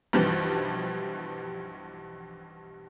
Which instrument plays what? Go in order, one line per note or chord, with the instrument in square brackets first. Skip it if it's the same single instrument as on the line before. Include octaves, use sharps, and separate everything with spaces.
[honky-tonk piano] B1 G2 B2 E3 F3 G3